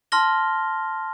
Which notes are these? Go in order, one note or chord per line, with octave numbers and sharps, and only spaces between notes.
A5 C6 F6 A#6 G7